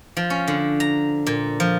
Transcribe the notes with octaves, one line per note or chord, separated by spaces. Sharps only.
F3
C#4
D3
A#5
A#2
F3